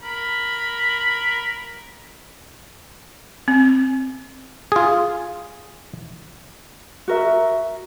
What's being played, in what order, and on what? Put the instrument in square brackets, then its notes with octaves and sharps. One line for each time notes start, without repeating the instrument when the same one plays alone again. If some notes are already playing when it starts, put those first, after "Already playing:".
[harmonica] A#4 B5
[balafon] C4
[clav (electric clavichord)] F4 G#4
[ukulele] F#4 A#4 E5